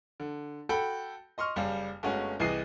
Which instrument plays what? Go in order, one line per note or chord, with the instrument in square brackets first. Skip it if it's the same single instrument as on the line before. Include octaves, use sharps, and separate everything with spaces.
[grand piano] D3
F#4 A4 G5 B5
D#5 C6 C#6 F6
F#1 G3 F5
G1 G#3 A3 C#4 F#4
C2 E3 G#4 D#5 G#5 C7